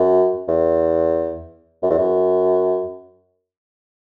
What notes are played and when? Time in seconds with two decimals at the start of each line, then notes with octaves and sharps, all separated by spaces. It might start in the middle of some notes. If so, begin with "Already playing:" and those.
Already playing: F#2
0.48 E2
1.82 F#2
1.90 E2
1.98 F#2